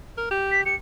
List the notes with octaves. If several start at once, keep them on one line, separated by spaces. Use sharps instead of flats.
A#4
G4
B6
G4 C#7